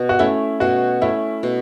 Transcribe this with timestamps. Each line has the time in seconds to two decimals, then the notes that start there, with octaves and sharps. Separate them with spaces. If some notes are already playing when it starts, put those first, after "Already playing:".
Already playing: B2
0.09 F#4
0.19 A3 C#4 E4
0.60 B2 F#4
1.01 A3 C#4 E4
1.43 B2